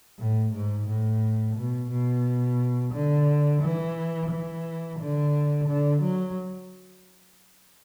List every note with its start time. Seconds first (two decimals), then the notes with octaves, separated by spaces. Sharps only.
0.19 A2
0.53 G#2
0.88 A2
1.56 B2
1.91 B2
2.93 D3
3.62 E3
4.30 E3
4.99 D3
5.68 D3
6.02 F#3